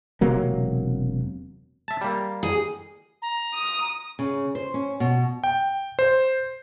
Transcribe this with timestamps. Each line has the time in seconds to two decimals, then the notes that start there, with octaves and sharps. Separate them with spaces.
0.21 E1 C3 F#3 A#3
1.88 E5 A5
2.01 G3 A#3
2.43 G#4
3.22 A#5
3.54 D#6
4.19 C#3
4.55 C5
4.74 C#4
5.00 B2
5.44 G5
5.99 C5